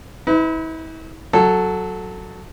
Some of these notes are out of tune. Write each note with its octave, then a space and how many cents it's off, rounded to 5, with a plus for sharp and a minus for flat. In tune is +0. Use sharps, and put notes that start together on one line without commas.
E4 -40 B4 +30
F#3 +0 A4 +0